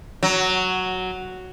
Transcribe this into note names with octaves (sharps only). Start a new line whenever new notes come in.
F#3